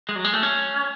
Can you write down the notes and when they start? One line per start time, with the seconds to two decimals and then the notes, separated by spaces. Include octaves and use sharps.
0.09 G#3
0.16 F#3
0.24 G#3
0.34 A3
0.43 C#4